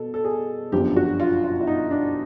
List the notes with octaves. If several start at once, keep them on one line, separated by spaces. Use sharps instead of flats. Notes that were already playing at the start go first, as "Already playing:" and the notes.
Already playing: B2 A4
A4
G#4
G1 F#2 D3 F3 G4
F#4
F4
F4
E4
D#4
D4